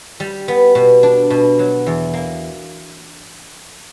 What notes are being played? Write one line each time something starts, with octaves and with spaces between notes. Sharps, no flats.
G3
B3
B2
D4
B2
F#3
E2
A#3